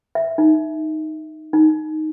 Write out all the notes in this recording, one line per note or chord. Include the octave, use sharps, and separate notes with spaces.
E5
D#4
D#4